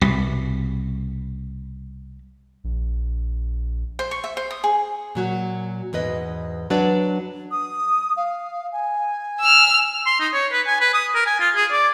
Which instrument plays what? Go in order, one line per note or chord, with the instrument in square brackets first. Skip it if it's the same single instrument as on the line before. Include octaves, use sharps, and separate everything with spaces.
[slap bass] C2 B2
[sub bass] A#1
[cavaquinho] C5
C#6
E5
C5
D#6
G#4
[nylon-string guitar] A#2 F#3 F#4
E2 G#2 B4 D#5
F#3 D4 B4 D5
[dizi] D#6
F5
G#5
[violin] E6 F6
[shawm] C6
D#4
C#5
B4
G#5
B4
D#6
A#4
G#5
F4
G#4
D5